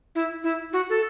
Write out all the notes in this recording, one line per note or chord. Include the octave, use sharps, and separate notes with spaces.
E4
E4
F#4
A4